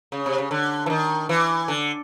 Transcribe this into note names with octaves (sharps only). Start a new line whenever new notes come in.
C#3
C3
C#3
D3
E3
D#3
E3
D3